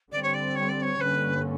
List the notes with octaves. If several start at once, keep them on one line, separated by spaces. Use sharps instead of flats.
D3 G3 C4 D5
C#5
D5
C#5
D5
C#5
G2 D3 G3 A#3 C#4 B4